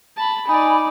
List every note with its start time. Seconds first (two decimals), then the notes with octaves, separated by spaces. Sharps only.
0.17 A5 B5
0.47 D#4 D5 G#5 B5